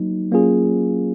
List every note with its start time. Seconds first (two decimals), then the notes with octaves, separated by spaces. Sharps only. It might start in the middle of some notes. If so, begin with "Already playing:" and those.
Already playing: F#3 A#3 D#4
0.32 F#3 A#3 C#4 F4 G#4